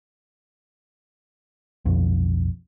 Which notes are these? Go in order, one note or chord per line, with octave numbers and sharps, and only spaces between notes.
B1 F2